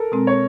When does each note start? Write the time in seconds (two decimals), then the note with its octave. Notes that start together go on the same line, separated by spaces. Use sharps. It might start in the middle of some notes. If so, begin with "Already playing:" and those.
Already playing: A4 A#4
0.12 B2 G#3 C4
0.27 C#5